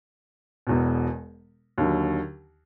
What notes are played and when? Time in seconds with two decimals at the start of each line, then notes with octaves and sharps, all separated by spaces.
0.67 E1 E2 B2
1.78 D#2 D3 F#3